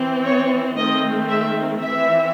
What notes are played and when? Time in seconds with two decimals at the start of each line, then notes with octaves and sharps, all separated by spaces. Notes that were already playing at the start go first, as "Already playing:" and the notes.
Already playing: E3 C4
0.25 C#5
0.77 D#3 A3 C4 D#5
1.29 E5
1.80 E3 C4 E5